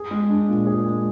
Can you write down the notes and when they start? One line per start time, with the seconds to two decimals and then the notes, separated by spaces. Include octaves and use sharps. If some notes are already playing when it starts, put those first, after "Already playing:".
Already playing: G#4
0.11 G#3
0.30 D4
0.49 A#2
0.67 G#4
0.86 G#3